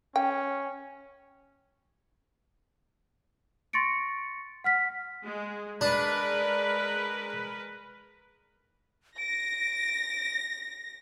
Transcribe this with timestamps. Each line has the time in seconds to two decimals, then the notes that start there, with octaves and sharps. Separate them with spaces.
0.16 C#4 G5
3.73 C6 C#6 A6 A#6 C#7 D7
4.64 F#5 F6 B6
5.23 G#3
5.81 G#3 D4 A#4 B4
9.18 A#6 D7